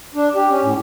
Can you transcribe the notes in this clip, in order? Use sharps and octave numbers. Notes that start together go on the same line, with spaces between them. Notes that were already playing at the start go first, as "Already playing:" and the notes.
D4
G4
C#4
A2